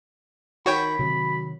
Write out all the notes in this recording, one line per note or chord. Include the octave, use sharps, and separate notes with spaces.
D#3 F#4 C#5 G5 B5
C3 D#3 F#3